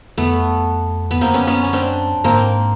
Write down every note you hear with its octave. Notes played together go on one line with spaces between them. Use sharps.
F2 A3 B3
F2 B3
F#2 A#3 C4
B3 C#4
B3 C#4
C#4
C4 D4
G#2 A#3 C4